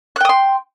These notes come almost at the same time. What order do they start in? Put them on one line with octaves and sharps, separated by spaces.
F#6 G5 D#6 C6